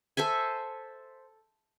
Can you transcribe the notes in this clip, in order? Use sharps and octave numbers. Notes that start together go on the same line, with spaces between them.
A4 C5 E5 G#5